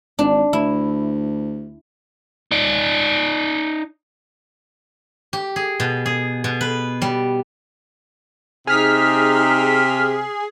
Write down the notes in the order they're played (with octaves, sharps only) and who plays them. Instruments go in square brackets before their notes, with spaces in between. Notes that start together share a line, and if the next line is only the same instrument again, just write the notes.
[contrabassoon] G#1 [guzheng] D4
[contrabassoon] D2 [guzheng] E4
[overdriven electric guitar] D#4 D5
[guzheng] G4
G#4
B2
G#4
B2
B4
G3
[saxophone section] C3 [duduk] D#4 [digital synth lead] G#4 [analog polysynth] F6 B6